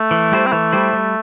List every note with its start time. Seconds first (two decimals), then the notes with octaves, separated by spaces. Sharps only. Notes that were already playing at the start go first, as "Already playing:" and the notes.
Already playing: A3
0.11 E3
0.32 G3 E4 G4 C5
0.46 C4
0.52 E3 A3
0.72 G3 E4 G4 C5
0.93 G3